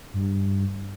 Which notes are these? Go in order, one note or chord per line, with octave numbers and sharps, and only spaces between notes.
G2